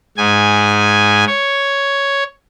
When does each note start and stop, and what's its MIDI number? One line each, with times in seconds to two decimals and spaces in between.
0.17 1.24 44
0.17 1.24 80
1.27 2.24 73